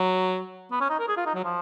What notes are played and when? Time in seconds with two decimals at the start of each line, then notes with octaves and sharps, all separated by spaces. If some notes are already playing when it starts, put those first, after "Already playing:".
Already playing: F#3
0.71 B3
0.80 C#4
0.89 D#4
0.99 A#4
1.08 G#4
1.17 F4
1.26 D#4
1.35 F#3
1.44 F3